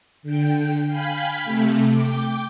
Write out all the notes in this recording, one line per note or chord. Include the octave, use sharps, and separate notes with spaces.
D3 G5
F5 G5 G#5 B5
C3 A3
G5 D6